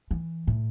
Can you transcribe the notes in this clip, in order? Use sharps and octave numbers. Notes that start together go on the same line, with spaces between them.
E3
A2